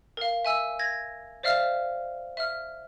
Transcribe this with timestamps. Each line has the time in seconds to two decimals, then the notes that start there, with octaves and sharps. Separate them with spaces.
0.17 A#4 F5
0.45 E5 G#5 E6
0.79 G#6 A#6
1.43 C5 D5 E5 F5 F6
2.37 E5 F6